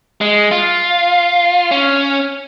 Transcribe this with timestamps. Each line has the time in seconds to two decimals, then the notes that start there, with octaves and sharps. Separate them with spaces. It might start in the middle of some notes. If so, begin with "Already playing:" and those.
0.21 G#3
0.51 F4
1.71 C#4